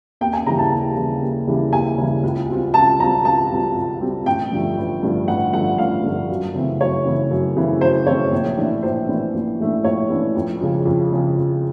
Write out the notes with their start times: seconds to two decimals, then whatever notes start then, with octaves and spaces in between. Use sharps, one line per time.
0.21 D#2 G5
0.33 G#5
0.46 C#3 E3 G3 A#5
0.58 A5
0.72 D#2
0.96 C#3 E3 G3
1.22 D#2
1.47 C#3 E3 G3
1.73 D#2 G#5
1.98 C#3 E3 G3
2.23 C#2
2.48 B2 G3 C4 F4
2.74 C#2 A5
3.00 B2 G3 C4 F4 A#5
3.25 C#2 A5
3.51 B2 G3 C4 F4
3.76 C#2
4.01 B2 G3 C4 F4
4.26 A1 G5
4.52 G2 D3 F3 A3
4.77 A1
5.03 G2 D3 F3 A3
5.28 A1 F#5
5.53 G2 D3 F3 A3 F#5
5.78 A1 F5
6.04 G2 D3 F3 A3
6.29 F#2
6.55 C#3 E3 A3 C4
6.80 F#2 C#5
7.05 C#3 E3 A3 C4
7.31 F#2
7.57 C#3 E3 A3 C4
7.81 F#2 C5
8.06 C#3 E3 A3 C4 C#5
8.32 A#1
8.57 A2 E3 A3 D4
8.83 A#1 C5
9.08 A2 E3 A3 D4
9.34 A#1
9.60 A2 E3 A3 D4
9.84 A#1 C#5
10.09 A2 E3 A3 D4
10.36 F2
10.60 C#3 F3 G#3
10.86 F2
11.11 C#3 F3 G#3
11.36 F2